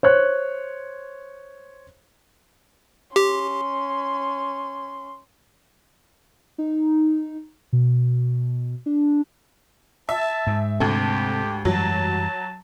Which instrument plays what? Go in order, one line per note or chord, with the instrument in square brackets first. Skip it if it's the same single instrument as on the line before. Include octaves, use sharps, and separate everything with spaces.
[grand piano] C5 C#5 F#6
[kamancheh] C#4 C6 [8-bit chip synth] G4
[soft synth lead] D#4
B2
D4
[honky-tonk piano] E5 [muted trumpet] A5
[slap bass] G#2
[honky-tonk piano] D2 A4 [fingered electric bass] C3 [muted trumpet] G4
[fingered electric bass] F#2 E3 G3 [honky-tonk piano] F#3 [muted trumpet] A5